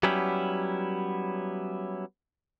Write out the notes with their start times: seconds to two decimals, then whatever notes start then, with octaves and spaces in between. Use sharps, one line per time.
0.03 F#3 G3 B3 C#4 E4 G4